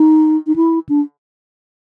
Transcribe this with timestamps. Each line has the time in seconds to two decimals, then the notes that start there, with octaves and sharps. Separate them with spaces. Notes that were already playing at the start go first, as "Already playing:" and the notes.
Already playing: D#4
0.47 D#4
0.56 E4
0.89 D4